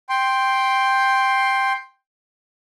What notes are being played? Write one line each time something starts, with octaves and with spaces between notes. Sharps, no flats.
G5 C6